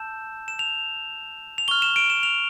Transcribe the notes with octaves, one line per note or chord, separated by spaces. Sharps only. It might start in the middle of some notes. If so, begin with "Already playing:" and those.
Already playing: A5 E6 G6 E7
E7
F7
F7
C#6 F6 G7
E7
D7
E7
F7